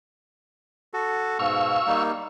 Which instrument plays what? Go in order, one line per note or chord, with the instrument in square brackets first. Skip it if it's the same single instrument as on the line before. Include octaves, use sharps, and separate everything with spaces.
[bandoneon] F#4 A4
[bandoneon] G#2 B2 [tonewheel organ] F5 C#6 E6
[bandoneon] G3 A#3 D#4